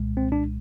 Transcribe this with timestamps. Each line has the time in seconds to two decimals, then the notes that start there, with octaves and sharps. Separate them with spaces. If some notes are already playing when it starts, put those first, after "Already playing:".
Already playing: C2 A#2 G#3
0.17 C4
0.32 D4